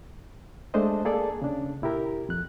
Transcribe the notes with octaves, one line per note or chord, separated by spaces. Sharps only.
G#3 A3 D4 C5 D#5
A#3 G#4 A4 D5
C#3 D4
A#2 E4 G4 A#4
F2 F#6